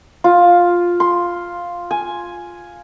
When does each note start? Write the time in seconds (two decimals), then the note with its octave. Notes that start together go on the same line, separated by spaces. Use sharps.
0.24 F4
1.00 C6
1.91 G#5